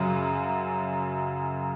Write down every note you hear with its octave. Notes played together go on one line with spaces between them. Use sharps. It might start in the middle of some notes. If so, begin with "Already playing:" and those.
Already playing: F#2 C#3 F#3